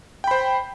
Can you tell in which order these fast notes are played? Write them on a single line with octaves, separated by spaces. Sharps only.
G5 B5 C5